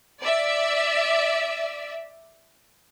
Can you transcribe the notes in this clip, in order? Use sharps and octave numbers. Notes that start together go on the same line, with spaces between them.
D5 E5